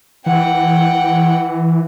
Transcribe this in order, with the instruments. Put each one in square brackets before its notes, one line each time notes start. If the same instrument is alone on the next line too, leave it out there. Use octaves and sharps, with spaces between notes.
[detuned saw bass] E3 [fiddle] F#5 G5